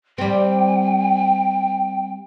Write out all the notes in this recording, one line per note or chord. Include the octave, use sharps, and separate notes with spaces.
G3 C4 G5